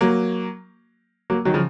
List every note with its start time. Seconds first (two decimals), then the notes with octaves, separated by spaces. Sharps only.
0.01 F#3 A#3
1.30 F#3 A#3
1.45 D#3 F#3
1.54 C#3 F3